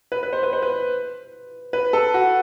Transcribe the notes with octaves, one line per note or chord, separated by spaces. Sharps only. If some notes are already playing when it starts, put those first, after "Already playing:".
B4
B4
C5
B4
C5
B4
B4
A4
F#4